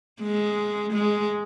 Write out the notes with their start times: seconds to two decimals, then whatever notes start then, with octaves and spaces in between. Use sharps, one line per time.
0.22 G#3
0.93 G#3